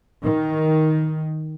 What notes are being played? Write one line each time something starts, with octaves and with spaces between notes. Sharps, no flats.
D#3